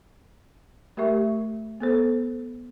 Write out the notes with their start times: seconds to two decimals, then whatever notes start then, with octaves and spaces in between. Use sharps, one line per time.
0.97 A3 G4 A#4 E5 C#6
1.80 B3 A4 C5